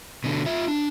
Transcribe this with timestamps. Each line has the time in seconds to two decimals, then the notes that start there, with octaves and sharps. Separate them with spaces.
0.24 B2 D3
0.46 F4 E5
0.68 D4